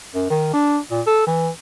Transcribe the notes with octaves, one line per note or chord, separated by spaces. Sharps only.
F#2
D#3
D4
A#2
A4
E3